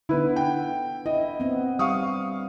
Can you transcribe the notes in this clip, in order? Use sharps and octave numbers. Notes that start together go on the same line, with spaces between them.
D3 B3 E4 B4
G5
E4 D#5
B3 C4
G3 F5 C#6 D#6